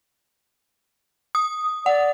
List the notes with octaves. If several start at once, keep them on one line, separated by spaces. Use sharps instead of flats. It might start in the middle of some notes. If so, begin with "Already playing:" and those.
D#6
D5 F#5